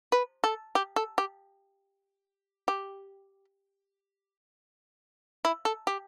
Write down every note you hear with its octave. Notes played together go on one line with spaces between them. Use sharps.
B4
A4
G4
A4
G4
G4
E4
A4
G4